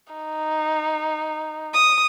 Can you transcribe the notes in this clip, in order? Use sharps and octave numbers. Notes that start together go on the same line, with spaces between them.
D#4
D#6